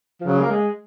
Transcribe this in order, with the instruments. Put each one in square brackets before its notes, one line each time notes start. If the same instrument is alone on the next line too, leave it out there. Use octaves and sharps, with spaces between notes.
[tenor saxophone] F3
[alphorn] C#3 [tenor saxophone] F#3
[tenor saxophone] A#3
G#3